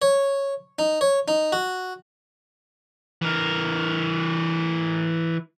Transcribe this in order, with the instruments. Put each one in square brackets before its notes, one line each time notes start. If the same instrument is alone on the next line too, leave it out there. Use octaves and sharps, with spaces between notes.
[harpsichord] C#5
D#4
C#5
D#4
F#4
[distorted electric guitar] E3 A#4